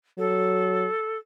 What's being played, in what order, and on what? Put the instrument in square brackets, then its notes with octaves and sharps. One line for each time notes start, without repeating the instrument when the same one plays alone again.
[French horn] F#3 [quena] A4